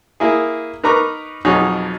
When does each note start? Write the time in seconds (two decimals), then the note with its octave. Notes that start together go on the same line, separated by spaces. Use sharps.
0.20 A#3 E4 G#4
0.83 D#4 A#4 B4 A#5 C#6 D6
1.45 B1 F2 B2 D#4 G#4 C#5